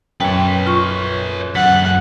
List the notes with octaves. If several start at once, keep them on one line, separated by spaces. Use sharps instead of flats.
F#2 B4 C#5 G5
F4 C#6
F#2 A4 F#5 B6